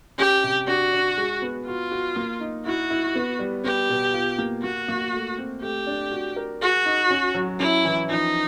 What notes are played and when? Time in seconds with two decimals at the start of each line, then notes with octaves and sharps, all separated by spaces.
0.18 C#4 G4
0.43 C3
0.67 D4 F#4
0.93 D4
1.17 G#3
1.42 B3
1.66 F4 F#4
1.91 F#4
2.16 A#3
2.40 D#4
2.66 E4 F#4
2.90 E4
3.15 B3
3.39 G3
3.64 B3 G4
3.89 B2
4.14 F4
4.38 A#3
4.63 A#3 F#4
4.88 A#3
5.13 A3
5.38 C4
5.62 A3 G4
5.87 D4
6.11 F#4
6.36 A#4
6.61 F#4 G#4
6.86 D#4
7.10 C#4
7.34 F#3
7.59 C#4 E4
7.85 E3
8.09 F3 D#4